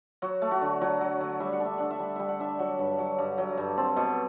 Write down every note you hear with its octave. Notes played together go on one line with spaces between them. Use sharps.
F#3 F#4
A3
F#4
D3
F#3 F#4
F#3
D3
G3 E5
F#5
D4
E5
D4 F#5
E5
G3 F#5
G3 E5
F#5
D4 E5
F#3 F#5
G2
F#3
G2
F#3
G2
C4 A5
B2